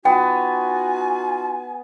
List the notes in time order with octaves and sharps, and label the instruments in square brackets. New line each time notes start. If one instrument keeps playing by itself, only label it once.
[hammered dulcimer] B3 [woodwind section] D#4 F4 F#4 [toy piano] G5 [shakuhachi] G#5